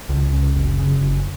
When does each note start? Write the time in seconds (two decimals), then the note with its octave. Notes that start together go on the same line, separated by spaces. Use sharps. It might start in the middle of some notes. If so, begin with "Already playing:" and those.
0.09 C#2
0.32 C#3
0.55 F#1
0.79 C#3
1.01 F#1